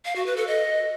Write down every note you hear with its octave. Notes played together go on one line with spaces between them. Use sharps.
F5
F#4
B4
A4
D#5